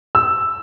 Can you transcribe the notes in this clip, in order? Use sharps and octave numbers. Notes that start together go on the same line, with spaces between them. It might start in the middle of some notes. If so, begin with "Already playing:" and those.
E6